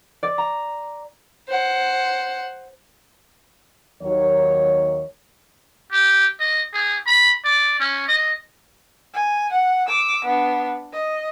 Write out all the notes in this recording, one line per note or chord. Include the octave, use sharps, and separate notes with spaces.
D5
A#5
C5 F#5
D#2 F#3 C#5
G4
D#5
G#4
B5
D5
C#4
D#5
G#5
F#5
D6 E6
B3 D4
D#5